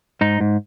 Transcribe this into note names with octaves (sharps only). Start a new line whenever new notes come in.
G#2 D#4
G#2